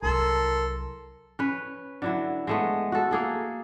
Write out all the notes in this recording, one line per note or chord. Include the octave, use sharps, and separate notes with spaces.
C2 F#3 A4 A#4 A5 A#5 C6
C#4 B4
D3 F#3 E4
G#3 A3 B3
F#4 A4
A#3 G#4 A4